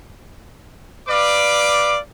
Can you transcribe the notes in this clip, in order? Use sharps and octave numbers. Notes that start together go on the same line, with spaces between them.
B4 D5 F5 D6